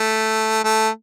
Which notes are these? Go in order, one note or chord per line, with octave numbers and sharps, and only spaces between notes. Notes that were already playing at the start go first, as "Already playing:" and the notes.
Already playing: A3
A3